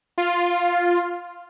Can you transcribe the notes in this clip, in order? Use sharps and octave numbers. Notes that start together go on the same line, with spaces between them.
F4